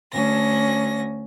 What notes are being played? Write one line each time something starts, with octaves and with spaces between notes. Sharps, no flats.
D2 C#4 A#6